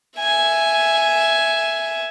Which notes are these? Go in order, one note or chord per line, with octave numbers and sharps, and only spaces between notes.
E5 G#5